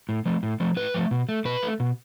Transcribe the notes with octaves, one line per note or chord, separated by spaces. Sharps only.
A2
F3 A3
A2
F3 A3
A2 B4
F3 A3
B2
A3
B2 B4
A3
B2